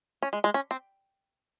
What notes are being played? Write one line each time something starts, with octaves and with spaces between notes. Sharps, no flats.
C#4
G#3
G#3
C#4
C4